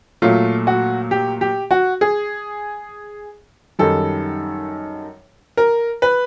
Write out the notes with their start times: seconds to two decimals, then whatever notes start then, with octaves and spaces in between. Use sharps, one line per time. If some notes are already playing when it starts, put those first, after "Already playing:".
0.22 A#2 F#3 A3 F4
0.67 F#4
1.11 G4
1.41 G4
1.71 F#4
2.01 G#4
3.79 F#2 D#3 G3 A4
5.57 A#4
6.02 B4